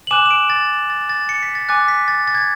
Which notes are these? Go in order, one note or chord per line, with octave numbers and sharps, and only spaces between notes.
F#7
G#5 D6 F#6 E7
E7
D7
A6
A6
A6
C#7
B6
A6
G#5 D6 F#6 A6
B6
A6
A6
G#6